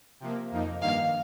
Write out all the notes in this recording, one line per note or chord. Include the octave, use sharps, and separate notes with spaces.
C3 F3 A#3
F2 F3 A#3 D#4
G2 D#3 A#3 F5